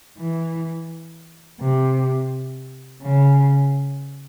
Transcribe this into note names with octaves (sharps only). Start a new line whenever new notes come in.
E3
C3
C#3